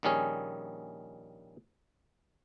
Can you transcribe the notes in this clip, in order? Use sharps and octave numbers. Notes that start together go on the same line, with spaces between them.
A#1 D#3 G3 C#4 G#4